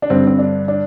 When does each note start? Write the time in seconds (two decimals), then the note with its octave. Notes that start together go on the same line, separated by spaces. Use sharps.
0.02 D4
0.10 G2 D3 C4
0.27 C4
0.39 D4
0.68 D4